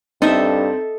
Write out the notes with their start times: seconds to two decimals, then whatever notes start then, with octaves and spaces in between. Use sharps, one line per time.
0.22 G2 C4 D#4 A4 D#5 E5